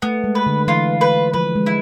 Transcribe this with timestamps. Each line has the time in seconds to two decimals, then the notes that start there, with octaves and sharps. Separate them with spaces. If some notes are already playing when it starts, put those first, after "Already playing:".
0.02 A3 B3
0.24 G#3
0.35 B4
0.46 D3
0.67 E3 F4
1.01 B4
1.33 F3 B4
1.56 G#3
1.66 E4